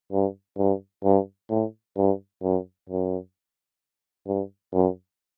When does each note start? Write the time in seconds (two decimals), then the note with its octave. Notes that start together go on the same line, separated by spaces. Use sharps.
0.12 G2
0.58 G2
1.04 G2
1.50 A2
1.97 G2
2.43 F#2
2.89 F#2
4.27 G2
4.74 F#2